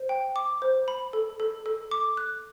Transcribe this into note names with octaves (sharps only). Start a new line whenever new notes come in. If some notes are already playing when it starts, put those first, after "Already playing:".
Already playing: C5
G5
D6
C5
B5
A4
A4
A4
D6
F#6